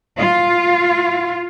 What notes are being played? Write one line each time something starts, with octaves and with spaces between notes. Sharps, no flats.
F4